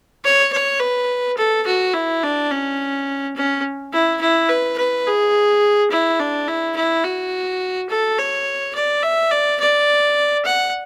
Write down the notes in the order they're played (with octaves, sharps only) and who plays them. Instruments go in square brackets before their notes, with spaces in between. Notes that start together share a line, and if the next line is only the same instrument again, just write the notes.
[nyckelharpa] C#5
C#5
B4
A4
F#4
E4
D4
C#4
C#4
E4
E4
B4
B4
G#4
E4
D4
E4
E4
F#4
A4
C#5
D5
E5
D5
D5
F#5